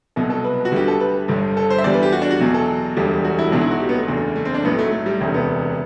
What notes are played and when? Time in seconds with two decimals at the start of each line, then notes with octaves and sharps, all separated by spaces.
0.16 C2 B2 F#3 A4
0.30 A4
0.44 B4
0.65 F#4
0.72 D2 D3 G3 G4
0.88 A4
1.00 B4
1.28 G1 G2 D3
1.57 A4
1.70 C5
1.78 E5
1.84 E2 D3 G3 D5
1.94 B4
2.03 G4
2.12 F#4
2.22 D4
2.31 F#4
2.40 E2 B2 F#3
2.54 A4
2.97 E1 D2 D3 G3
3.24 F#4
3.39 E4
3.52 B1 B2 F#3 D4
3.61 E4
3.71 F#4
3.80 G4
3.89 B3
3.98 A3
4.08 F#1 E2 D3
4.36 A3
4.45 C4
4.54 D4
4.64 B1 A2 F#3 B3
4.78 A3
4.92 A3
5.06 G3
5.20 E1 D2 C3
5.34 B3